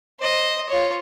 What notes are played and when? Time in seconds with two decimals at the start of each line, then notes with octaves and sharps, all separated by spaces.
0.20 C5 D#5
0.69 F4 C#5